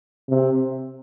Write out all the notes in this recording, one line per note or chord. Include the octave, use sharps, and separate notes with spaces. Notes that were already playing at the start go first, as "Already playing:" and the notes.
C3